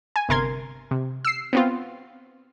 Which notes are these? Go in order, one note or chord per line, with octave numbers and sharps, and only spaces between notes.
G#5
G1 C3 A#4 C6 G#6
C3
E6 C7
B3 C4 F4